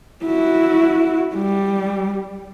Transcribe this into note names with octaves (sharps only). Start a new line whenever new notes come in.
E4 F#4
G3